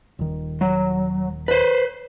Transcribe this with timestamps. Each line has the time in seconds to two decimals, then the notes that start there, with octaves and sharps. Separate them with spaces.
0.19 D#1 D#3
0.61 F#3
1.48 B4 C5